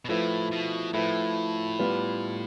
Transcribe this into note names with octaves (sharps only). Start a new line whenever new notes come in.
B2
A2 F3 A3 E4 B4
B2
A2 F3 A3 E4 B4
G3 B3 F4 B4 D5